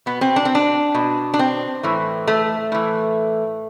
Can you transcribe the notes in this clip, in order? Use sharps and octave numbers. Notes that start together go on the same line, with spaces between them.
B2 B3
C4
D4
C4
D4
B2
D4
C4
A2 E3
A3
A2 E3